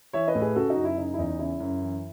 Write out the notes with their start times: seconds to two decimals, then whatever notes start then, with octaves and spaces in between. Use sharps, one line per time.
0.13 E3 C#5 E5
0.28 B4 D#5
0.35 A2
0.42 G#4 B4
0.56 C#3 F#4 A4
0.70 D#4 F#4
0.76 F#2
0.84 E4
0.97 C#3 D#4
1.14 E4
1.18 E2 D#4
1.39 C#3 E4
1.60 F#2
1.82 E3